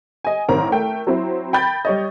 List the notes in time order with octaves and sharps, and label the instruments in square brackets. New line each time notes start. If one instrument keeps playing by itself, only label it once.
[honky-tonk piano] D#5 G#5
A1 D#3 C4 A#4 A#5
A3 A#4 G5
F#3 C4 E4
G5 B5 G6 A6
G3 C#5 D#5